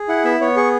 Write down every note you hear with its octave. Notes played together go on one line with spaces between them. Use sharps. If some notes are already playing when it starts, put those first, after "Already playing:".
Already playing: G#4
E4 F#5
B3 E5
B3 C#5
G#4 C#6